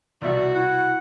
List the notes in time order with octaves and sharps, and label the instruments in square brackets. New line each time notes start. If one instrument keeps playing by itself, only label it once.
[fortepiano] C2 B2 E5 [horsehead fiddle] F#4 [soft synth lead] D5
[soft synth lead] E4 [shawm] F#5